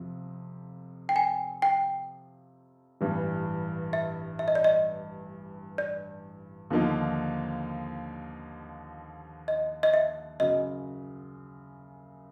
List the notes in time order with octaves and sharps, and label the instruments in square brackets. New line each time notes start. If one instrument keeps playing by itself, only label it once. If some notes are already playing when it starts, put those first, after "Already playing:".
Already playing: [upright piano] F2 C3 F3
[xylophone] G5
G#5
G5
[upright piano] A1 G2 E3 G3
[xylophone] E5
E5
D#5
D5
D#5
D5
[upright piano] D#2 D3 F3 A#3 D#4
[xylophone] D#5
D#5
E5
[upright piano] F#2 C#3 F#3 [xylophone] D#5